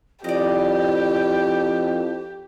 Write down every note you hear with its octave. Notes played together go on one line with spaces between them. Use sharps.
F2 E4 G4 D5 D#5